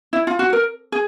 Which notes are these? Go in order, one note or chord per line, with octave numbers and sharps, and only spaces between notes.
E4
F4
F#4
A#4
G#4